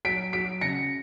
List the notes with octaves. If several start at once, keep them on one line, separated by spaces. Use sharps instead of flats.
F#3 B6 D7
F#3 B6 D7
C#3 A#6 C#7